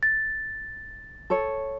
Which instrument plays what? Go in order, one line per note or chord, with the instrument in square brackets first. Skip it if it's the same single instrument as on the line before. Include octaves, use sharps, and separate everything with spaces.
[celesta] A6
[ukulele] A4 C#5